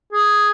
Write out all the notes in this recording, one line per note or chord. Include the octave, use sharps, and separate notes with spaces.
G#4